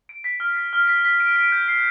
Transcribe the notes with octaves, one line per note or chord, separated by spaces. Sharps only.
D7
B6
F6
B6
F6
B6
B6
D7
D7
G6
C7